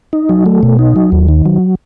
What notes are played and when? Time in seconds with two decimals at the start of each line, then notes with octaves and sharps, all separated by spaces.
0.13 D#4
0.29 F#3
0.46 A3
0.63 B2
0.79 D#4
0.96 F#3
1.12 D#2
1.28 D#3
1.46 F#3